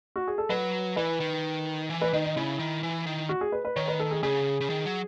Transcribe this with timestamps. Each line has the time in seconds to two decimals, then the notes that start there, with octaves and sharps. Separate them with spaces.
0.16 F#4
0.28 G#4
0.38 A4
0.50 F#3 B4
0.96 E3 B4
1.20 D#3
1.90 E3
2.01 B4
2.13 D#3 D#4
2.24 D#4
2.36 C#3 E4
2.59 D#3
2.83 E3
3.06 D#3
3.29 F#4
3.41 G#4
3.52 B4
3.65 B4
3.76 D#3 C#5
3.88 B4
4.00 A4
4.11 G#4
4.23 C#3 G#4
4.61 C#3
4.70 D#3
4.85 F#3